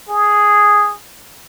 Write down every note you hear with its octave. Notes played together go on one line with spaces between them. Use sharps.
G#4